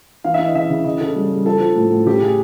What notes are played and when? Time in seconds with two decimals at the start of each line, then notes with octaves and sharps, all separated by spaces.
0.24 E3 F5
0.34 E5
0.39 E3
0.45 D#5
0.54 C#3 E5
0.70 C#3
0.84 C#3 D#5
1.00 C#3 A4
1.15 G3
1.30 G3
1.45 F3 A4
1.60 F3
1.75 A2
1.91 A2
2.06 C#3 G4
2.22 C#3 G#4